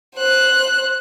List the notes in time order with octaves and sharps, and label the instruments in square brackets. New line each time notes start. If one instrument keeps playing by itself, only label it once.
[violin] C5 F#6